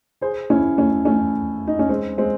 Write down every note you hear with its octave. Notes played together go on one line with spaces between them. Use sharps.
G#4 C5
C#4 E4
A3 C#4
A3 C#4
D#4
C#4
G#3 C4
G#3 C4